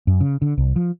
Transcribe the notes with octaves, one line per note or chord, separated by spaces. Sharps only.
F#2
C#3
D3
C2
F3